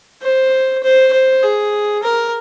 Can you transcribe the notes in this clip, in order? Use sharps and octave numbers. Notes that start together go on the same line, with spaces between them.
C5
C5
C5
G#4
A#4